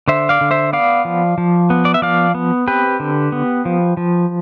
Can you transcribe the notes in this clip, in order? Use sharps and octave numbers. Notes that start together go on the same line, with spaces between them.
D3 C5 E5
D5 F5
D3
C5 E5
B3 D5 F5
F3
F3
B3
D5
E5
F3 D5 F5
B3
C4 G4 B4
D3
B3
F3
F3